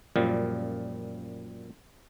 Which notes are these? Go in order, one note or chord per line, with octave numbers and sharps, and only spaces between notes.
F#2 A#2 F3 G3